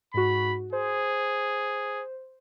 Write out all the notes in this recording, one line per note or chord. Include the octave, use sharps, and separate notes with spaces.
G#2 F#4 B5
G#4 C5